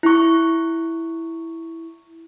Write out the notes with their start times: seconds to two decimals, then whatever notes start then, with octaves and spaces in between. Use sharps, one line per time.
0.03 E4 C#6